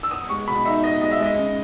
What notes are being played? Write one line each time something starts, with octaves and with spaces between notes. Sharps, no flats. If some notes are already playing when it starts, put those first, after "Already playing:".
E6
B3 D#6
G#3 C#6
B2 B5
D#4 E5
B3 D#5
G#3 D#5
E5
G#3 D#5
C#3